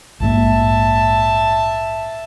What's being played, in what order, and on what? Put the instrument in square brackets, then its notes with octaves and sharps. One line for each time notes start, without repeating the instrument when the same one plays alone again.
[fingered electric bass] A#1 G#2 A#3 [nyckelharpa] E5 A5